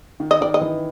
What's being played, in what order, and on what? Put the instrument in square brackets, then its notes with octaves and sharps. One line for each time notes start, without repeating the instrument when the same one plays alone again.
[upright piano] D#3
[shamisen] D#5
[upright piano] D#3 [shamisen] D5
[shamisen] D#5
[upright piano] E3